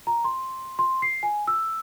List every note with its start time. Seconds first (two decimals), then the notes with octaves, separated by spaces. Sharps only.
0.07 A#5
0.24 C6
0.79 C6
1.02 C7
1.23 G#5
1.47 E6